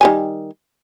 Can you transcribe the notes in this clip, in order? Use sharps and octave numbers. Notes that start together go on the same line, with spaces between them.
D#3 G3 G#5